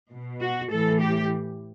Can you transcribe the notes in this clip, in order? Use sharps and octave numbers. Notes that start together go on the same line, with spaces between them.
B2
F#4
A2 E3 A4
G4